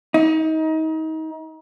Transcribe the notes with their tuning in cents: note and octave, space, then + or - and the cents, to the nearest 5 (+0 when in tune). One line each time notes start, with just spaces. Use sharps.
D#4 +30